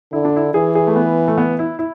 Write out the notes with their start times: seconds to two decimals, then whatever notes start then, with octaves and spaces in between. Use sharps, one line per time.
0.13 D3 E4
0.25 D4
0.36 E4
0.54 E3 G#4
0.75 G#4
0.87 A3
0.96 B3
1.28 A3
1.38 B3
1.59 E4
1.79 E4